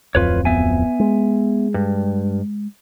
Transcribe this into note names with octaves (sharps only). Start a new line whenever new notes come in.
D1 F2 F4 B4 C#5
B3 E5 G#5
G#3
G2